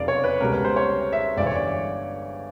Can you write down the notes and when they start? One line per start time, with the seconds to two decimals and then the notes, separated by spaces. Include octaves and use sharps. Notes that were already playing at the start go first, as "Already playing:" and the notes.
Already playing: F1 E2 C#3 F#3 D5 F5
0.08 C#5
0.24 B4
0.40 C#2 B2 G3 A#4
0.52 B4
0.65 C5
0.76 C#5
1.13 E5
1.37 G1 G2 E3 D5
1.46 C#5
1.55 D5